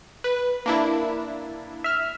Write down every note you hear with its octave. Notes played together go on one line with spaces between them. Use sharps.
B4
A#3 D4 E4
E5 F6